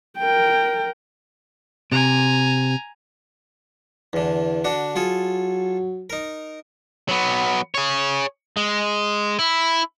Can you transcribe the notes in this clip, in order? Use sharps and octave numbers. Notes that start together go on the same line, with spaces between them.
A#4 G5
C3 G#5 A#5
E2 D3 E3
D3 D4 F#4
F#3 F4 G#4 A4
D#4 A#4
F#3 B3
G#4 C#5
G#3
E4